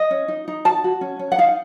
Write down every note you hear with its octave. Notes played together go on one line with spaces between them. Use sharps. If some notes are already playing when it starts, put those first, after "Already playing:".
Already playing: D#5
C#4
D#4
D#4
F#4 A5
F#4
C#4
C#4
F#5
D#4 F5